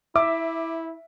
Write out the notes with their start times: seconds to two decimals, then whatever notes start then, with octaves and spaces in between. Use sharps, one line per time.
0.16 E4 E5 D6